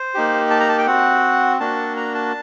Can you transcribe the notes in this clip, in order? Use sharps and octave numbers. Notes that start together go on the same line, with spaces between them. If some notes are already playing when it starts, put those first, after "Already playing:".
Already playing: C5
A#3 D#4 G4
A5
A#5
A5
G5
C4 F#4 F#5
A#3 D4 F#4 A5
A#5
A5